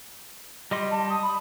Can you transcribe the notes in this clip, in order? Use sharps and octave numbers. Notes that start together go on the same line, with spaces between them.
G3 D#5 C6
A5
D#6
B5